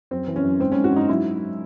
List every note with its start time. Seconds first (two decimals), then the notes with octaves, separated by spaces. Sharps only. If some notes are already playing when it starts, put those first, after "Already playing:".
0.11 F#2 C4
0.28 E3
0.36 C#4
0.43 F#2
0.60 G#2 C4
0.72 C#4
0.77 G#2
0.84 F#4
0.92 G#2 D#4
1.09 F#3 E4